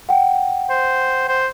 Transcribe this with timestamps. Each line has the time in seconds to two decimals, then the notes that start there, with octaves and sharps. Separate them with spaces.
0.09 F#5 G5
0.70 C5
1.28 C5